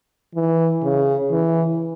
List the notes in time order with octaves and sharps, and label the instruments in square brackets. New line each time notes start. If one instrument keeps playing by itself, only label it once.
[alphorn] E3
C#3
E3